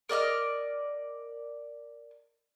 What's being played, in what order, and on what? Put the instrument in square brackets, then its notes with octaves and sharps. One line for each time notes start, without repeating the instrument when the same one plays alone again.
[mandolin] A#4 D5 D#5 F6